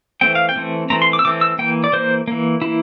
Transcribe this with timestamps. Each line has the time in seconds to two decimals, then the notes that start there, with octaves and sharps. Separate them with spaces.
0.21 E3 A3 C4 G5
0.35 F5
0.49 G5
0.56 E3 A3 C4
0.90 E3 A3 C4 A#5
1.02 C6
1.13 D6
1.19 E6
1.25 E3 A3 C4 D6
1.41 E6
1.59 E3 A#3 G5
1.84 D5
1.93 E3 A#3 C5
2.27 E3 A#3
2.62 E3 A#3 E4